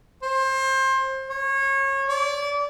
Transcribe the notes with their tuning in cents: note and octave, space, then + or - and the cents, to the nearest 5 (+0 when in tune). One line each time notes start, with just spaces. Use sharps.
C5 +25
C#5 -30
D5 -30